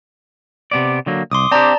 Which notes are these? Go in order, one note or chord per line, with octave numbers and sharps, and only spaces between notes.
C3 B3 D5
D3 F#3 A#3
C2 C6 D6 D#6
C4 D4 G4 D5 A5 A#5